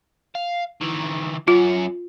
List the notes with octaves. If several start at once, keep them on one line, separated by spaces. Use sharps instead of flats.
F5
D#3 E3
F#2 C#4 F4